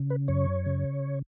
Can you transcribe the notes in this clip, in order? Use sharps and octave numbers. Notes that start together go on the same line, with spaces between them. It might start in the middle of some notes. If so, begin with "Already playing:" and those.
Already playing: C#3
B4
F#2 C#5
C#3